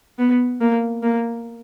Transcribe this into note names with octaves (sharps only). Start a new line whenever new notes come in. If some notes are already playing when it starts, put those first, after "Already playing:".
B3
A#3
A#3